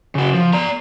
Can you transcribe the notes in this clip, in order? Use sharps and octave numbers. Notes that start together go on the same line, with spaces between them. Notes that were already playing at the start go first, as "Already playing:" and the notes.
C#3 F#4
F3
D5 A#5